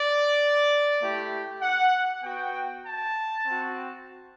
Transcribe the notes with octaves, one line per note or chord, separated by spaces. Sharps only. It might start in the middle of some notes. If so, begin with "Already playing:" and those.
Already playing: D5
A3 E4 G4
F#5
B3 F#4 G5
A5
C4 F#4